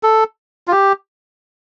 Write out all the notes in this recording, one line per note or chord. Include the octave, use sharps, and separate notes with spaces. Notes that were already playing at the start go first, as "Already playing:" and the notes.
A4
F4
G4